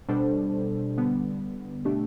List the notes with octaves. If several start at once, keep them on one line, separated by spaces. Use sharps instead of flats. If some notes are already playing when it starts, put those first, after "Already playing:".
B2 G3 D4 A4 C5
D3 G3 B3
B2 A3 D4 G4